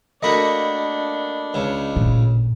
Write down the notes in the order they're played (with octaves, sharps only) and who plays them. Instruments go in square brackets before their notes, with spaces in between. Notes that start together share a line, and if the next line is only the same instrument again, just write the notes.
[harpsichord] A3 A#3 F#4 [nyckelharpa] D4 [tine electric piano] D#5 B5
[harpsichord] C#2 C#3
[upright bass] A1 A#2